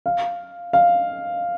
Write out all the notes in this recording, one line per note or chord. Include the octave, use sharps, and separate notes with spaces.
F5
F5